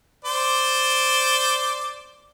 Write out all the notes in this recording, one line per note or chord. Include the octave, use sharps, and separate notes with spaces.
C5 D5